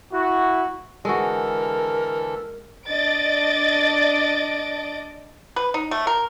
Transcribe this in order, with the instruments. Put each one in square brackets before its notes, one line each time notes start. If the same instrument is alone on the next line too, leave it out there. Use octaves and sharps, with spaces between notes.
[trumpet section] E4 F#4
[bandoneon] D3 E3 A4 [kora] G#3 F#4 [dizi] A#4
[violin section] D4 D5 D#5 A6 D7
[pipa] B4
D#4
A3
A#4